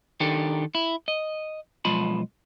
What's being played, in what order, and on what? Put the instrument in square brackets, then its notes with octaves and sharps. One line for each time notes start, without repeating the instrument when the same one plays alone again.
[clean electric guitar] D#3 D4 G4 A4 A#4
E4
D#5
B1 F3 G#3 F4 A5 B5